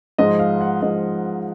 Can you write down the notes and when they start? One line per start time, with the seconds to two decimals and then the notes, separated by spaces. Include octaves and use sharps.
0.18 G#2 F3 G#3 D#5
0.39 F5
0.61 F#5
0.82 G#2 F3 G#3 D#5